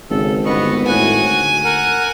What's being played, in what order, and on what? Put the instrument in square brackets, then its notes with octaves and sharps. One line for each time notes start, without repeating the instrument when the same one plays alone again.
[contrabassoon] G#1 [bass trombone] C#3 [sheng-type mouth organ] A4
[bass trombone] G1 [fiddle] B3 [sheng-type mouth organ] D#5 C#6
[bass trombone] A2 [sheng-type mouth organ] F#4 F#5 [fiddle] G#5
[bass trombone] D2
[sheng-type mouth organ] A#4 F#5